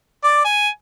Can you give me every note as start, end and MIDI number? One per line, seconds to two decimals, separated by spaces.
0.24 0.42 74
0.45 0.68 80